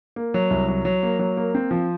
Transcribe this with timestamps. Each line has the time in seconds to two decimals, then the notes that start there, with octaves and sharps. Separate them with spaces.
0.16 A#3
0.34 F#3
0.50 C2
0.68 F#3
0.85 F#3
1.03 A#3
1.19 F#3
1.37 A#3
1.54 C4
1.71 F3